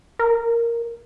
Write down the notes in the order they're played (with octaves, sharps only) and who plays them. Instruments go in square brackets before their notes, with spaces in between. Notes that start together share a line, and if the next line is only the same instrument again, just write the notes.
[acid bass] A#4